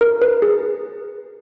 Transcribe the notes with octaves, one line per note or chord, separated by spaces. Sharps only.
A#4
B4
G#4